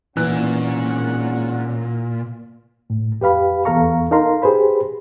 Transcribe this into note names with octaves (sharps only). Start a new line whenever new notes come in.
G#1 A#2 E3 C#4 F#5 F#6
A2
F2 G4 B4 F5 B5
E2 B3 A4 F5 A#5 C#6
D#4 A4 A#4 F5 A#5 C6
G4 G#4 B4 C5 B5